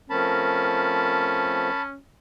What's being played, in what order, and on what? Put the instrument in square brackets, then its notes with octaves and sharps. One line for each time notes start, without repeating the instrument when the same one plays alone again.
[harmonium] F3 A3 C4 [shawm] C#4 [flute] A#4 [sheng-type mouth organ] A5 B5